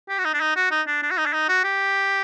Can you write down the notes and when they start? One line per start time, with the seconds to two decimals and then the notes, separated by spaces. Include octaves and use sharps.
0.09 G4
0.18 F#4
0.25 D#4
0.34 D4
0.40 D#4
0.56 F#4
0.71 D#4
0.87 D4
1.03 D4
1.11 F#4
1.18 D#4
1.26 D4
1.33 D#4
1.49 F#4
1.64 G4